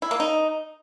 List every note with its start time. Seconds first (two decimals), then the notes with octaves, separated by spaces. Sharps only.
0.02 E4
0.11 A#3
0.20 D#4